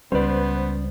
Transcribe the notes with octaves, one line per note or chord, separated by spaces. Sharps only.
C#2 G3 B3 C#4 B4 C5 D5